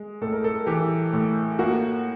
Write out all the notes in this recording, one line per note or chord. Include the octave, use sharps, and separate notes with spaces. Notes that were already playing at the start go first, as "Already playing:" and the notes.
Already playing: G#3
A2 A4
A#4
A4
E3 G4
A2
A#3 F#4